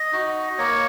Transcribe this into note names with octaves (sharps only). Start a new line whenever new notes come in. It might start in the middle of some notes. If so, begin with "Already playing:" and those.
Already playing: D#5
D#4 F#4
A#3 C#5